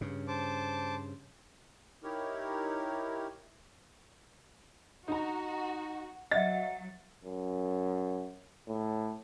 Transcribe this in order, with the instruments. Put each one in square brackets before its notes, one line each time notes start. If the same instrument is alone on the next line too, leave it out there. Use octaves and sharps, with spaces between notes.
[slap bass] G2 C#3
[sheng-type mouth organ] C5 A5 D6
[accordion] D#4 E4 G4 A#4 C#5
[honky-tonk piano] D#4 A#5 [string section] F#4
[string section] F#3 [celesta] D#5 E5 [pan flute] F#5 [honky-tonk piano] A6
[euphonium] F#2
A2